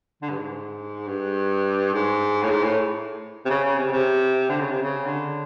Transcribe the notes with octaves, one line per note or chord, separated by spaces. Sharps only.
D3
G2
G#2
G2
G#2
A2
G#2
A2
C3
C#3
C#3
C3
C3
D3
C#3
C3
C#3
D3